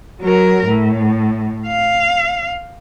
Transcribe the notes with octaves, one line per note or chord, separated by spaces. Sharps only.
F#3 A#4
A2
F5